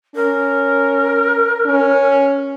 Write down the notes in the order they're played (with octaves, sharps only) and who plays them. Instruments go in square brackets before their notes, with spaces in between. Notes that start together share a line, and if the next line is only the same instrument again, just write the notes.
[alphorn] C#4 [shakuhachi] A#4
[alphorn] C#4